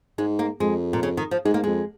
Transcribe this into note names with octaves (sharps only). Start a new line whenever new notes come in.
G#2 G#3
A#3
F2 G#3
A#2
C#3
D#3
F3
G#2 G#3
A#3
F2 G#3